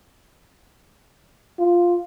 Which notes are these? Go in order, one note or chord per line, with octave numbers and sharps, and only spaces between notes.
F4